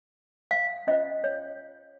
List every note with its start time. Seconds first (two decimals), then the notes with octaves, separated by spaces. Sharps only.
0.51 F5
0.87 C#4 F4 C5 D#5
1.24 C#5